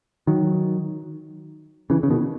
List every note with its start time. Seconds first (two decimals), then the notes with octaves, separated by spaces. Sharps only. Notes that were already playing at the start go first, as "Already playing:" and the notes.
0.27 D#3 F#3
1.90 C#3 E3
2.03 C#3
2.10 B2 D#3